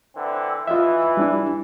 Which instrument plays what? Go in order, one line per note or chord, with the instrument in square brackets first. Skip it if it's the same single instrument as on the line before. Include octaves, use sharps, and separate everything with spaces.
[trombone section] D3 E3 C4
[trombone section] E3 [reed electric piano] F4 D#5 E5
[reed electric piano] G3 D4 E4